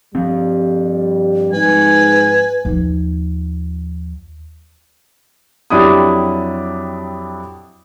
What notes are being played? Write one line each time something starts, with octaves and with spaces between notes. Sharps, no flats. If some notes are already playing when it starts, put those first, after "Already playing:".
G2 F3 G3 C4
G#2 B4 G#5
D#2 F3
F2 F#3 D4 E4 G4 D#6